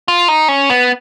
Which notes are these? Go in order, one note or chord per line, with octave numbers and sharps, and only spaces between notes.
F4
D#4
C#4
B3